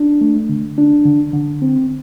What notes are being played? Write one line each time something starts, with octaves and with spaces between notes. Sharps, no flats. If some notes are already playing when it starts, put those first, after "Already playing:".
Already playing: D4
A3
D3
D4
D3
D3
C4